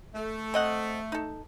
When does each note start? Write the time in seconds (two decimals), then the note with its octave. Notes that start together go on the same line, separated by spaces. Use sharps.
0.14 A3
0.54 C4 D#5 F#5
1.12 D#4 A4